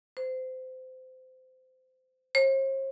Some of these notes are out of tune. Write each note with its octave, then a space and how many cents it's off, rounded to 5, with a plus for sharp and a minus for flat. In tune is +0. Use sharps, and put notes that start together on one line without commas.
C5 -25
C5 +45